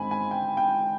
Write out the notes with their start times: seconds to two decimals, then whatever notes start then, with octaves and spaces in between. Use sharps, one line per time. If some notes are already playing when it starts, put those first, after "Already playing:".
Already playing: G#2 D#3 G#3 C4 D#4 G#5 B5
0.11 G#5
0.31 G5
0.57 G5